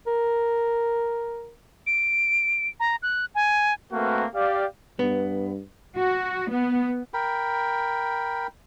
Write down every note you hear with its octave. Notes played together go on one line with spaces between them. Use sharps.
A#4
D7
A#5
F#6
G#5
A3 A#3 C4 F#4 A#4 B4
G4 D5 F5
G2 B3
F#4
B3
A#4 G5 B5